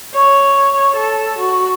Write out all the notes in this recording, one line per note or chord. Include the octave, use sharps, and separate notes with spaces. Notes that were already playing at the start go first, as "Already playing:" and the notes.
C#5
A4
F#4